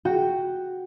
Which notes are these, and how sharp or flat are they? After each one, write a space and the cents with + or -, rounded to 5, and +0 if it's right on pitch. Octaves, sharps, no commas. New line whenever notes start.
F#4 +0 G5 +0